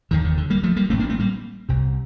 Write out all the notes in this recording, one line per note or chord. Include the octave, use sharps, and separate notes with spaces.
F1 D#2 D3 D#3
D#3
D3
G3 A#3
F3 A3
G3 A#3
A1 A2 A3 C4
A#3 D4
A3 C4
G3 A#3
C2 C3